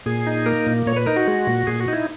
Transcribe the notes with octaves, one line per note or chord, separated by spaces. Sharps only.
A#2 G#4
D#4
A#3 A#4
A#2
A#2 C#5
B4
D#4 A#4
F#4
G#3
A#2
A#2 G#4
F#4
D#4 E4